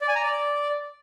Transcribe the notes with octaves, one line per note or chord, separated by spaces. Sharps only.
D5
G#5
A#5
D5